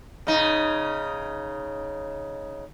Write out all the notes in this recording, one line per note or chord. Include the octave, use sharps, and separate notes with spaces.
C#3 D#4